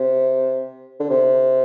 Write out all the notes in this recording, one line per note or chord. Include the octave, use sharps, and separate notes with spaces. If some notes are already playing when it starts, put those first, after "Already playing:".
Already playing: C3
D3
C3